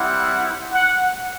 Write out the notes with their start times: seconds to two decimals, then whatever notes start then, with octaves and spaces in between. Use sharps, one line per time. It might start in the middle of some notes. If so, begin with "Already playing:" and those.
Already playing: G3 C4 E4 F#5
0.73 F#5